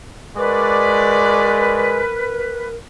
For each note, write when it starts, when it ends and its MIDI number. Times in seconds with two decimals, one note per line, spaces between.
0.36 2.03 56
0.36 1.88 66
0.36 2.75 70
0.36 2.67 71
0.36 1.88 74